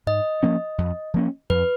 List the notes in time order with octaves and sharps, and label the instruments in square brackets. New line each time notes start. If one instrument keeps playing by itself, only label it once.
[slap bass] G#2 [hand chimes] D#5
[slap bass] F3 A#3 C#4
F2
F3 A#3 C#4
[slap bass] F2 [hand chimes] B4